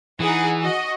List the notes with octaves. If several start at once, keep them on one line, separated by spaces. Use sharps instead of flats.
E3 D#4 G#4 F#5
F#4 D#5